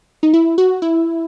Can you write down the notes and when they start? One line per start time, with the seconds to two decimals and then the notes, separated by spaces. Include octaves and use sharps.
0.23 D#4
0.34 E4
0.58 F#4
0.82 E4